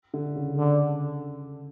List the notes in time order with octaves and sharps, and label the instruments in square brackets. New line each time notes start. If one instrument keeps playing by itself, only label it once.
[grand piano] D3
C#3
[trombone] D3